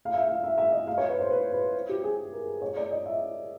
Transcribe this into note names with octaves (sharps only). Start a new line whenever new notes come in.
F5
E5
F5
E5
E5
D#5
F5
C#5
B4
C5
B4
B4
G4
G#4
A#4
C#5
D5
D#5
E5